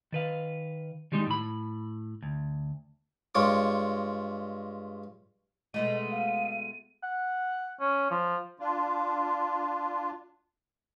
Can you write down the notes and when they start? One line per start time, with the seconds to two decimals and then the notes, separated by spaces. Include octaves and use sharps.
0.12 D#3 B4 F5
1.12 D#3 G3 G#3 D4 D#4
1.27 A2 B5
2.23 D2
3.35 G2 G#3 F4 C#5 D6
5.74 B2 G#3 A3 D#5 D#7
6.11 F5
7.03 F#5
7.80 C#4
8.10 F3
8.60 D4 F4